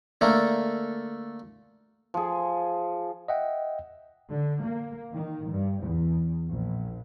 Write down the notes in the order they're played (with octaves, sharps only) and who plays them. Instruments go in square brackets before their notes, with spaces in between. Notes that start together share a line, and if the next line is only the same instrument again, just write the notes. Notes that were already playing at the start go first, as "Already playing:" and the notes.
[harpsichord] D3 A3 A#3
[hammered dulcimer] F3 G#4
[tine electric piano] D#5 E5 F#5 G5
[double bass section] D3
A#3
D#3
G2
E2
A#1